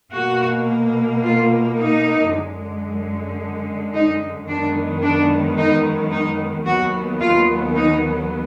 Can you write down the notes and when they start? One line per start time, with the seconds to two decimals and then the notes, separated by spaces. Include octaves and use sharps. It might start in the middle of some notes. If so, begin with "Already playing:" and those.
0.13 B2 A#3 F#4
1.22 F4
1.76 D#4
2.30 F#2 D3 G#3
3.94 D#4
4.48 F#2 D#3 G#3 B3 D4
5.02 D4
5.58 D#4
6.12 D#4
6.66 D#2 D#3 F#3 B3 F#4
7.21 F4
7.75 D#4